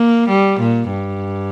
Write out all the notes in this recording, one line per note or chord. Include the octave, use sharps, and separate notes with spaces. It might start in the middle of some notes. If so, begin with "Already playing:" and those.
Already playing: A#3
G3
A#2
G2